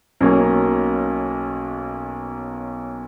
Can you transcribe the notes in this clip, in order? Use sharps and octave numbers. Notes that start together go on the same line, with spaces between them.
B1 B2 F#3 A#3 C#4